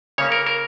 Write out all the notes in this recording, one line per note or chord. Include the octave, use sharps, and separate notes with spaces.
C#3 A#3 C#4 C#5
A#4
A#4